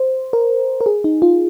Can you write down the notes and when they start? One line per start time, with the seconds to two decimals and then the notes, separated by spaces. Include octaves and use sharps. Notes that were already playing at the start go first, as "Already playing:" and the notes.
Already playing: C5
0.33 A#4
0.81 A#4
0.86 G#4
1.04 D#4
1.22 F4